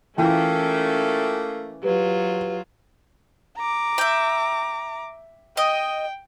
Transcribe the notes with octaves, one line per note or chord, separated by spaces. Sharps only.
E3 A3 A#3 C#4 F4 G5
F#3 F4 G4 B4
A#5 D6
E5 G5
D#5 G5